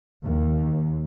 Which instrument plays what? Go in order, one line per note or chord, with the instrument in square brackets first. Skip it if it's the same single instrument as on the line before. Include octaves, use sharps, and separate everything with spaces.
[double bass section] D#2